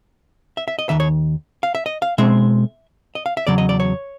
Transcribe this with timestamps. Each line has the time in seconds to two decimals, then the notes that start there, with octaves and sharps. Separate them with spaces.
0.57 E5
0.68 E5
0.79 D#5
0.89 D#2 D#3 E5
1.00 C#5
1.63 F5
1.75 E5
1.86 D#5
2.02 F5
2.18 B2 G#3 C4 E5
3.15 D#5
3.26 F5
3.37 E5
3.47 E2 C#3 F#3 D5
3.58 D#5
3.69 D5
3.80 C#5